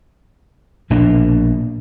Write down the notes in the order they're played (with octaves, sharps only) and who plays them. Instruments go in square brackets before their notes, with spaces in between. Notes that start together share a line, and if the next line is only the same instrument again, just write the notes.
[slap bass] A#1 B2 A#3 D4